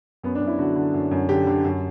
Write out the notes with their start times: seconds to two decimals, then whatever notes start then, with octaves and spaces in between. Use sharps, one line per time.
0.23 F#2 B3
0.35 D4
0.41 F#2
0.47 E4
0.59 D3 F#4
0.76 D3
0.94 F#2
1.11 F#2
1.29 D3 G4
1.47 D3
1.64 F#2